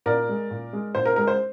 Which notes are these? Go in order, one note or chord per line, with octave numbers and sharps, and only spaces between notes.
A#2 A#4 D5
G#3
A#2
G#3
A#2 C5
A#4
G#3 A#4
C5